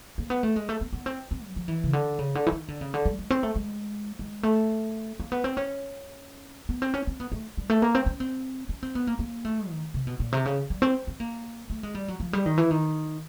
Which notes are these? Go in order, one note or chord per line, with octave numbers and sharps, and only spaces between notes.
A#3
B3
A3
G#3
A3
B3
B3
C4
C4
F#3
F3
E3
C#3
D3
C#3
D3
E3
D#3
D3
C#3
D3
G3
G#3
C4
A3
G#3
G#3
A3
A#3
B3
C4
C#4
B3
C4
C#4
C4
B3
A3
G3
A3
A#3
C4
C#4
C4
C#4
C4
B3
A#3
A#3
A3
D#3
C3
B2
A#2
C3
C#3
G3
C4
C4
A#3
A3
G#3
G3
F#3
F3
G3
D#3
E3
D#3